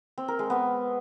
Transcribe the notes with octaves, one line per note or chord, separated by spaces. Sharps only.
C4
A#4
G#3
B3